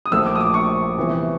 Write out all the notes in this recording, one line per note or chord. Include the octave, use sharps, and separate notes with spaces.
D#6
A#1 A#2 F3 A3 E6
D6
D#6
D6
C#6
C3 E3 G3 B3